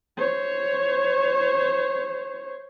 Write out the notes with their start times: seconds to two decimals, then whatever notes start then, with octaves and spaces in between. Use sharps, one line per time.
0.17 C5 C#5